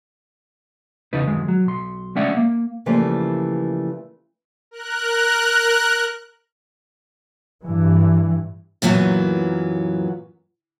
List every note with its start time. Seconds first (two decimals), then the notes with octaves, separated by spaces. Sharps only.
1.13 E2 C#3 D#4 B4
1.27 F#2 D#3 G#3
1.48 F#3
1.66 B1 C6
2.15 G#3 A3 C#4 D5 E5 F#5
2.37 A#3
2.86 C#3 E3 F3 G3 A3 A#3
4.71 A#4 F#6
7.64 G2 E3
8.82 F#2 A#2 E3 F#3 B3